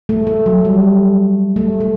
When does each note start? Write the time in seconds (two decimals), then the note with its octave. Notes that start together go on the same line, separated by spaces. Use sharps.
0.09 A3
0.27 A3
0.46 F#3
0.65 G3
1.56 A3
1.80 A3